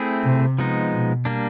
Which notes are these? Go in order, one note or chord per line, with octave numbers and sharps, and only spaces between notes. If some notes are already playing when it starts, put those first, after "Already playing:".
Already playing: A3 C4 E4 G#4
C3
F3 G#3 B3 D#4
B2
G3 A#3 D4